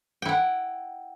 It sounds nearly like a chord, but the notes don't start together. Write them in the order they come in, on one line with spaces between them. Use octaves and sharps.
G5 E4 F#5